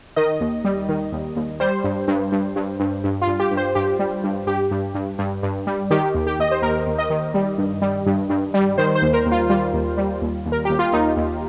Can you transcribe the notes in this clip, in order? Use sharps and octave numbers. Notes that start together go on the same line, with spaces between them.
D#3 D#5
D#2
G3
D#3
D#2
D#2
G3 C5
G2
G2
G2
G2
G2
G2
F4
G2
G4
G2
C5
G2 G4
G3
G2
G2 G4
G2
G2
G2
G2
G3
D#3 G4
D#2
G4
D#2 D#5
C5
D#2 A#4
D#2
D#5
D#3
G3
G2
G3
G2
G2
G3
D#3 C5
C5
D#2
A#4
D#2
F4
G3 F4
D#2
G3
D#2
D#2
A#4
D#2 G4
F4
D#2 D#4
D#2